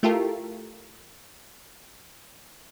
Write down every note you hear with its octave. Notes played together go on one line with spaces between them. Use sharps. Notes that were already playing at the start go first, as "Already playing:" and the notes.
A3 E4 F4 G4 A4 A#4